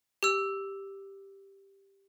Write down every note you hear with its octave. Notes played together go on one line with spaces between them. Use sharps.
G4 E6